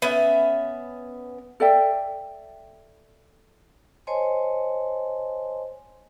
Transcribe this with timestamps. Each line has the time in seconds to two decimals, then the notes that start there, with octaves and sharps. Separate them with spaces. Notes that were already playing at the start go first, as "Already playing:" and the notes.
0.02 B3 C#4 E5
1.60 A4 D5 E5 G5
4.07 C5 C#5 D#5 G#5 A5 C6